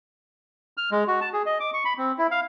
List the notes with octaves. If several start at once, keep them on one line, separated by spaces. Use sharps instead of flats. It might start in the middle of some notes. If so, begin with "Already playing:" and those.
F6
G#3
F#4
A5
G#4
D#5
D6
C#6
B5
C4
E4
F5